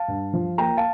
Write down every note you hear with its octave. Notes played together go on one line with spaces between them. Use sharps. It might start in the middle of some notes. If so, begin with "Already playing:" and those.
Already playing: F5 A5
G2
F3
A#3 G5 A#5
F5 A5